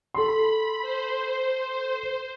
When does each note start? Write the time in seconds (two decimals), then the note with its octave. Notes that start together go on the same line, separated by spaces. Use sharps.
0.14 A4 B5 C6
0.82 C5